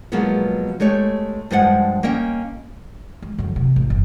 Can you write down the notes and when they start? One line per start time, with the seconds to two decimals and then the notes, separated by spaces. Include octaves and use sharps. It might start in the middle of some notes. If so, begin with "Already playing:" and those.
0.12 B2 F3 F#3 G#3 A#3 B3
0.80 G#3 A3 G4 C#5
1.51 G2 F3 G#3 F#5
2.03 A#3 C#4 D#5 G5
3.22 G#3
3.38 F#2 D3
3.56 C3
3.76 A1
3.90 F#1